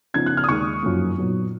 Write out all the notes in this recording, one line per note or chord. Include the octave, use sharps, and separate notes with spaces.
C#3 F3 B3 D#4 G#6
F#6
F6
D#6
D#2 D#3 G#3 D#4 C#6
F#2 F3 A#3
A#2 F#3 B3 D#4